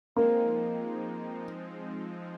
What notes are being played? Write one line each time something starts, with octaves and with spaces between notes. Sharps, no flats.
F3 G#3 A#3 C4 D#4